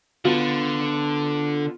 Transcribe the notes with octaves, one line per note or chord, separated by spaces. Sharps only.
D3 B3 F4